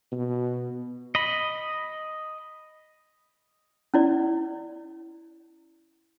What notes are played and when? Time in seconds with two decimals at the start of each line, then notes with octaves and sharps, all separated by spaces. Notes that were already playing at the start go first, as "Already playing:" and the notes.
0.12 B2
1.15 D#5 B5
3.94 C#4 E4 D5